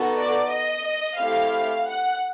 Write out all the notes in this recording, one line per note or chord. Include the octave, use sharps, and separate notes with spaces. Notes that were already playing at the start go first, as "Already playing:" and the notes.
Already playing: B3 D#4 F#4 A4
D5
D#5
A3 C4 E4 G4 F5
F#5